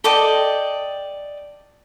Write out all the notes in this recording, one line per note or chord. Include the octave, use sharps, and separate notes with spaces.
A4 D5 D#5 G5